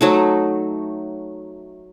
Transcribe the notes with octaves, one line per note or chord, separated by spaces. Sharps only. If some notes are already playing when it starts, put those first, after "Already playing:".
F#3 A3 D#4